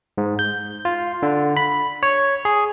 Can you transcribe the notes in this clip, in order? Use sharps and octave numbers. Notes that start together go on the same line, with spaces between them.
G#2
G6
F4
D3
B5
C#5
G#4